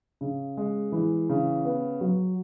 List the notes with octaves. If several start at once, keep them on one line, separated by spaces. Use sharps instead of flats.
C#3
G#3
E3
C#3
B3
F#3